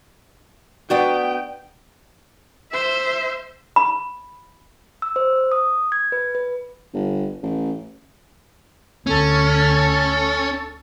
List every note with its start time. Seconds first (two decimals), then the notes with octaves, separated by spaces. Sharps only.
0.90 B3 D4 F#4 G5
2.71 C5 E5
3.76 B5
5.02 E6
5.16 C5
5.52 D#6
5.92 G#6
6.12 B4
6.35 B4
6.94 G1
7.43 A1
9.07 D2 C#4 A4